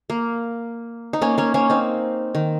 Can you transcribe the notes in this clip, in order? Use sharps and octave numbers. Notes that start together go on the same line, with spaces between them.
A#3
D#4
A#3 C#4
A#3 C#4
A#3 C#4
C4 D#4
D#3